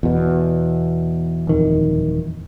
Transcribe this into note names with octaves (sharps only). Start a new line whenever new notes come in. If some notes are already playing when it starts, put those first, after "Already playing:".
E2 B2
D#1 F2 D#3